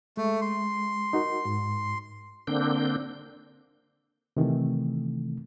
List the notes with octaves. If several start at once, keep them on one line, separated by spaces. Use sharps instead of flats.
G#3 A3
C6
D#4 F#4 A#4
G#2
D3 A#3 C4 D4 G6
C3 D#3 E3 A3